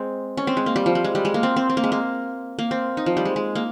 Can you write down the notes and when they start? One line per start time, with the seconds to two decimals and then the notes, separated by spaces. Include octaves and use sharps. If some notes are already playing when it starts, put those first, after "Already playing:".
Already playing: G#3 C4
0.37 C#4
0.47 C4
0.57 G#3
0.66 A#3
0.76 G3
0.86 F3
0.95 G3
1.04 G#3
1.15 G3
1.25 G#3
1.34 A#3
1.43 C4
1.56 C4
1.69 C4
1.77 A#3
1.84 G#3
1.92 A#3
2.59 A#3
2.71 C4
2.97 D#4
3.06 F3
3.17 G3
3.25 G#3
3.36 G#3
3.55 A#3